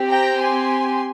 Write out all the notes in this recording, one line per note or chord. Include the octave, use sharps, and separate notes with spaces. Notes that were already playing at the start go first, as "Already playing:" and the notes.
Already playing: C4 G4
G5 A#5
G#5 C6